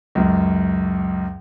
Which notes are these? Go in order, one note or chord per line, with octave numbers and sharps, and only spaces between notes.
C#2 F#2